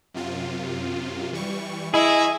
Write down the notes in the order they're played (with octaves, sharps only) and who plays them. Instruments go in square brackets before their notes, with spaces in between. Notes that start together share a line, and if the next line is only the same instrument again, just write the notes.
[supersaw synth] F#2 C3 F4
E3 G3 C#6
[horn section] E4 [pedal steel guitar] G#4 [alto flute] D#5 [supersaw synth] C#6